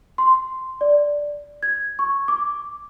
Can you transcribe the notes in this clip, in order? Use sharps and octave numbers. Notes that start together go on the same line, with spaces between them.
C6
D5
G#6
C#6
D6